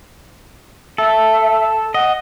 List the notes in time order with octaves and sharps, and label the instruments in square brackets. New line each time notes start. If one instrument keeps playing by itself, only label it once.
[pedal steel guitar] A4 [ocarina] E5
[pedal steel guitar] D#5 [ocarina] F#5